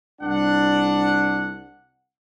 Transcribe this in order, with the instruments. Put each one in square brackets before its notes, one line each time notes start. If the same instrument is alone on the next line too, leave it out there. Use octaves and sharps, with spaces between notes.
[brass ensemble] C2 D4 F#5